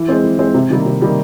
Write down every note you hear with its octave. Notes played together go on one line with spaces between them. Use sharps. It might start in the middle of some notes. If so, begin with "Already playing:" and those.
Already playing: E3
G#3 C4
E3
G#3 C4
C3
D#3 G3 A#3
C3
D#3 G3 A#3